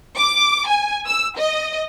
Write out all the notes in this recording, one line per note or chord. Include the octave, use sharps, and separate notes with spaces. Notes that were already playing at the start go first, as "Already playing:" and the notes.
D6
G#5
E6
D#5